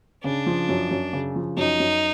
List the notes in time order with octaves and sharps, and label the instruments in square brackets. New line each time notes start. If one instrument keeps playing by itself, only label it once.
[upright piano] C#3 [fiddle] D4
[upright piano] F3
F#2
F#2
C#3
F3
[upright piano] F#2 [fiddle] D#4
[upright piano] F#2